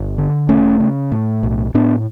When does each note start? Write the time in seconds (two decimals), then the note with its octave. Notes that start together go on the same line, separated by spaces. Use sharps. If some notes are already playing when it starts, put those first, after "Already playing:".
Already playing: G1
0.18 D3
0.49 E1 A3 C#4
0.80 C#3
1.12 A2
1.43 B1
1.74 A2 B3 D4